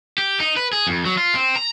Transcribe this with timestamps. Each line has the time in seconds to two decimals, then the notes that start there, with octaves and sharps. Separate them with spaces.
0.18 G4
0.40 D#4
0.56 B4
0.73 G#4
0.87 F2
1.05 F#3
1.17 F4
1.35 C4
1.56 A#5